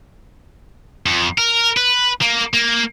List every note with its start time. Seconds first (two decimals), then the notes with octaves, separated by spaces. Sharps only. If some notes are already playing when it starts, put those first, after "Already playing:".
1.06 F2
1.38 A#4
1.77 B4
2.22 A#3
2.54 A#3